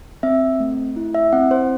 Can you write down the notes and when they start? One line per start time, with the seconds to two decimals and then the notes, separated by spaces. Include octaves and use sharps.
0.23 C4 E5
0.60 A3
0.96 E4
1.14 E5
1.33 C4 F#5
1.51 C5